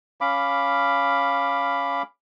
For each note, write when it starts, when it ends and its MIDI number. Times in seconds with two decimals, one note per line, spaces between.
0.21 2.02 61
0.21 2.02 77
0.21 2.02 83
0.21 2.02 86